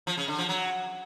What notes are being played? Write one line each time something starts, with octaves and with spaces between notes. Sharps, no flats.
F3
C#3
D3
F3
F#3